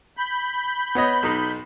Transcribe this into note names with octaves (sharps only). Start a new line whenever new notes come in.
B5 G6
B3 C#5 D#5
B1 D#4